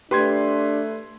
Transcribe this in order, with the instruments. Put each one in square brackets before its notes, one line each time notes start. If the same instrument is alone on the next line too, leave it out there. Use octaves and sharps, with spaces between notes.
[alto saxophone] A3 [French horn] D4 [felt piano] G4 [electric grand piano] B4 C6 G#6